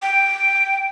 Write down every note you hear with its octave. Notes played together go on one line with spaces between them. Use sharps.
G5